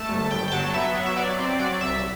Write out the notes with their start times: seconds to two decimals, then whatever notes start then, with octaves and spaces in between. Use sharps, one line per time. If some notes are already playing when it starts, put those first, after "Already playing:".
Already playing: A3 A5
0.09 G1
0.30 G1 G5
0.48 G5
0.52 F#3 A5
0.73 B3 E5
0.95 F#3
1.06 E5
1.16 F#3 D5
1.39 C4
1.59 F#3 D5
1.81 C2 E5